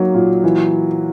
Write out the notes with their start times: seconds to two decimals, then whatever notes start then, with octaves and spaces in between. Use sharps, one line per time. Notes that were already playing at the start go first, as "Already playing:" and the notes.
Already playing: F#3 A#3 D#4
0.14 A#2
0.44 E3